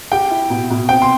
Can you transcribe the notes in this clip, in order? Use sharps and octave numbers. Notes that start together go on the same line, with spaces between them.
G4 G5
E4
B2
B2
C4 G5
C6